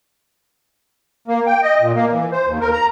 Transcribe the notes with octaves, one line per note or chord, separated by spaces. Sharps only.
A#3
G5
D#5
A#2
A#3
E3
C5
D#2
A#4
A#5